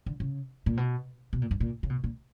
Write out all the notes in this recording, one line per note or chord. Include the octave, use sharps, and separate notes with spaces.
D3
C#3
A#2
B2
B2
A#2
G2
A#2
C#3
B2
A#2